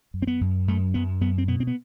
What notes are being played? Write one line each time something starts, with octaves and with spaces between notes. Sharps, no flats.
F#2
C4
B3
F#2
F#2 A3
F#2 B3
F#2 B3
C4
B2 B3
C4
B3